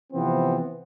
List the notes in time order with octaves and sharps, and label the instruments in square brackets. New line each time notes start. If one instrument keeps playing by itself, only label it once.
[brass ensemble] C3 E3 F3 B3 C4